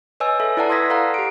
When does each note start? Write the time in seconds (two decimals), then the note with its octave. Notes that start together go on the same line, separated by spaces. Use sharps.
0.20 B4 C#5 D#5 G#5 E6
0.40 A4 B4 E5
0.57 E4 B4 D5 F#5 A5 A#5
0.70 C6 D#6 E6 G#6 A#6 B6
0.90 A4 F5 F#5 A#5
1.14 G4 D7